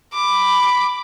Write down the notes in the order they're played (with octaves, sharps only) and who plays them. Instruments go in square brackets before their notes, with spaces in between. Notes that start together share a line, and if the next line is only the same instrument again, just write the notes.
[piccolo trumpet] B5 [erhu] D6